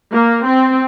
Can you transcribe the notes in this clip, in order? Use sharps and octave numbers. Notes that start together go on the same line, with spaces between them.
A#3
C4